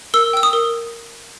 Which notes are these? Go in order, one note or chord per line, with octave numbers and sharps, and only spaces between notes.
A#4 E6
G5 E6
D#6
A#4